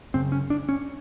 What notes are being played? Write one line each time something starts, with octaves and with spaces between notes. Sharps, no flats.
F#2 C#3 C4
C#4
D4
C#4